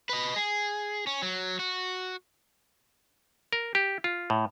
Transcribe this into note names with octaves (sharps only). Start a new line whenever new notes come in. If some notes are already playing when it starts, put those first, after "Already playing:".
B4 D#5
G#4
C#4
F#3
F#4
A#4
G4
F4
A2